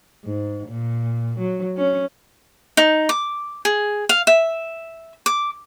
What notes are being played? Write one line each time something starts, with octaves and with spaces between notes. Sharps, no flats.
G#2
A#2
F#3
C#4
D#4
D6
G#4
F5
E5
D6